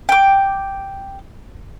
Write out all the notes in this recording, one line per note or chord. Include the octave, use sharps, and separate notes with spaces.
G5 D6